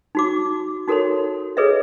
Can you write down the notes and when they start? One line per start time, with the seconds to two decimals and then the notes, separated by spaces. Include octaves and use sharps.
0.15 D#4 F#4 D6
0.88 D#4 F#4 A4 A#4 C#5 C6
1.57 G#4 A4 B4 C#5 D#5 E5